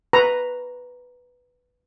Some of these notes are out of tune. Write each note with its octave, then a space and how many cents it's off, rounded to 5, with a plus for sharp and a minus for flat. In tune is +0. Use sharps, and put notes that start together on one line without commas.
B4 +0 A#5 +0 C#6 +0